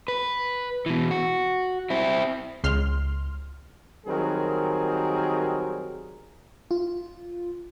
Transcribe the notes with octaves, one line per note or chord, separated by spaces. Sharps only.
B4
B2 E3
F#4
C4 E4
C#2 C6 F6
D#3 F#3 G3 C4 G#4 A#4
F4